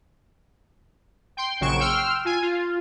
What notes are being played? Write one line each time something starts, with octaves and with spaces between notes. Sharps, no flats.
G5 C6
A#1 C#3 F#3 C#6 D7 E7
G5 C6 E6 F6
F4 G#5
F4